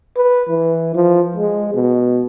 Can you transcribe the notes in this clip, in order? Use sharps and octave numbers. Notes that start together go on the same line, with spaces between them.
B4
E3
F3
G#3
B2